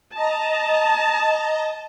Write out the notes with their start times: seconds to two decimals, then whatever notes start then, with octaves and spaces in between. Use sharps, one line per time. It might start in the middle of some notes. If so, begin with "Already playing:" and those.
0.14 D#5 A5 A#5